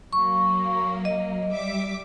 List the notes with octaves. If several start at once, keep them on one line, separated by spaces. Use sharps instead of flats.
F#3 A#3 C#6
D#5
G3 E5 D6